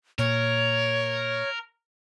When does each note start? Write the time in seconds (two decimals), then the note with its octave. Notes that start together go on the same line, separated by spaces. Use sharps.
0.19 A#2 A#4 C#5